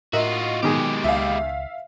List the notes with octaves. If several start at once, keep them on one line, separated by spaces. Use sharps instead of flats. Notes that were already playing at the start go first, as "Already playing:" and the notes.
A2 F4 F#4 A#4 D#5 E5
B2 D#3 G#3 G4 G#4
C#2 E5 F5